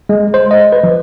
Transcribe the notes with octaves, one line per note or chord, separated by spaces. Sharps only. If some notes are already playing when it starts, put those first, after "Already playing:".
G#3
C5
D#5
B4
F3